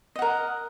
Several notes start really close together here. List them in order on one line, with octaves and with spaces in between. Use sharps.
D#5 F#5 A#4